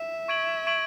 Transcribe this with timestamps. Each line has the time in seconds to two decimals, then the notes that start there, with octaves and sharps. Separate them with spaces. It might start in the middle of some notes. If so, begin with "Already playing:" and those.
Already playing: E5
0.28 C#6 G#6 D7 F#7
0.67 C#6 G#6 D7 F#7